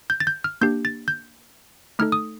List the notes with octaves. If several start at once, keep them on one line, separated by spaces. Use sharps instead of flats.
G6
A6
G6
F6
A#3 D4 G4 G6
A6
G6
A3 D#4 A4 F6
D#6